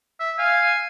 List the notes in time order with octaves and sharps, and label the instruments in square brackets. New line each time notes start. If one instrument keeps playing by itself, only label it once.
[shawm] E5
[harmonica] F5 [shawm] G#5